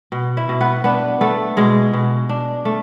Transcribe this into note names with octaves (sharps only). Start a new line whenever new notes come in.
B2
E4 E5
B2
B3 B4
B3 D4 B4
A3 B3 A4
B2 G#3 G#4
B2
D4
A3